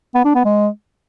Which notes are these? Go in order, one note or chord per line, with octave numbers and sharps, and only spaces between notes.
B3
D4
B3
G#3